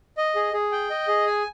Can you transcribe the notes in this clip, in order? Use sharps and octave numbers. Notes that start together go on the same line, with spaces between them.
D#5
G#4
G#4
G5
D#5
G#4
G#5